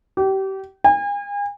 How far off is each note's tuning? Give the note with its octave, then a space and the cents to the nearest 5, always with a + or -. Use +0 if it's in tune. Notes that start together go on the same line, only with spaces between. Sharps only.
G4 -30
G#5 -40